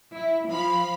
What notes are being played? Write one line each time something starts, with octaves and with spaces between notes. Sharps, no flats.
E4
F3 F5 B5